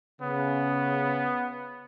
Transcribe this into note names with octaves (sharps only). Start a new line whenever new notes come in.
C#3 B3